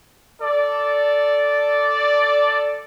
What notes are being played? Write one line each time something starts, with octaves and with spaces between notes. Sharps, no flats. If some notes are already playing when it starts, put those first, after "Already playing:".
A4 D5